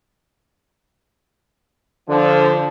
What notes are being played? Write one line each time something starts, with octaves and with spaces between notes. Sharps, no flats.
D3 F3